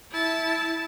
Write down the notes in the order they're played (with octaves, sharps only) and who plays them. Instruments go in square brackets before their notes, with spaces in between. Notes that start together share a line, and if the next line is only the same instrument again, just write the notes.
[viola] E4 A5